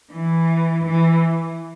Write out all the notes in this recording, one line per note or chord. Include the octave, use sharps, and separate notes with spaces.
E3
E3